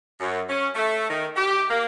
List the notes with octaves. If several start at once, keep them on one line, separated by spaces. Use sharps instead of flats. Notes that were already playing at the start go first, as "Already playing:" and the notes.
F#2
C#4
A3
D#3
G4
A#3